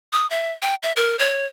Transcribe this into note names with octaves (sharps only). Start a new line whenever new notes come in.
D#6
E5
G5
E5
A#4
C#5